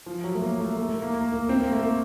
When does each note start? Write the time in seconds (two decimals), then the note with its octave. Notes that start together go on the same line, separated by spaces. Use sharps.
0.06 F3
0.24 F#3
0.35 A3
0.42 A#3
0.60 A3
0.78 A3
0.89 A3
1.02 A#3
1.14 A#3
1.32 A#3
1.49 C4
1.61 A#3
1.72 A3
1.84 A#3